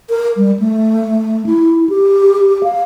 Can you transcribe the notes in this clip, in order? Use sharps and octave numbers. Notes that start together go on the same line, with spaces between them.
A#4
G3
A3
E4
G4
F5